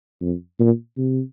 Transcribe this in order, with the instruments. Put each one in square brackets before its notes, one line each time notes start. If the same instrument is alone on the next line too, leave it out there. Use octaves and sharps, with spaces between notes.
[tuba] F2
A#2
C3